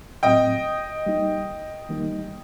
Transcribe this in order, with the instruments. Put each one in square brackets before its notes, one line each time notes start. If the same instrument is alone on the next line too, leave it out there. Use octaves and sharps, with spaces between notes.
[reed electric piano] A2 F#3 C4 [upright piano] D#5 G5
[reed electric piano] G3 A#3 D#4 G4
D#3 G3 A#3 D#4